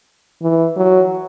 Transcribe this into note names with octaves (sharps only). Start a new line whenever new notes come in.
E3
F#3